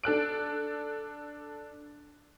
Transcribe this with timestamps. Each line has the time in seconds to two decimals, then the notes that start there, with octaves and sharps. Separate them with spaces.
0.04 D4 A4 F#6 D7